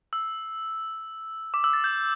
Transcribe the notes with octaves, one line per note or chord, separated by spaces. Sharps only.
E6
D6
E6
A6
G6